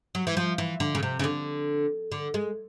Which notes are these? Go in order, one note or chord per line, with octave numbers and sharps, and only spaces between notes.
F#3
E3
F3
E3
D3
C#3
C3
C#3
D3
D3
G#3